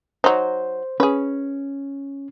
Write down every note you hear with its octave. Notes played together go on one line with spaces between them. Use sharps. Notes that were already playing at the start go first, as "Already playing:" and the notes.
F#3 D#4 C5
C#4 G#4 B4